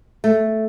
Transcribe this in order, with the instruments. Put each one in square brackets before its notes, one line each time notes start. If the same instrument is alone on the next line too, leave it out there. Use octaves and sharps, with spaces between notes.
[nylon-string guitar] A3